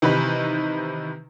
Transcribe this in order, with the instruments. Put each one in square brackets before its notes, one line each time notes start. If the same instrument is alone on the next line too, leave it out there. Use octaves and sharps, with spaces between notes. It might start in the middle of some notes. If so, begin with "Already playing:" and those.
[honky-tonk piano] C3 D#3 E3 D#4 B4